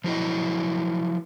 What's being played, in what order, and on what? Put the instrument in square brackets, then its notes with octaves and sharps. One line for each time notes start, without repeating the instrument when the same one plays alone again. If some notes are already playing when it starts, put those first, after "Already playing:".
[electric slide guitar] F3 F#3 E4 D#5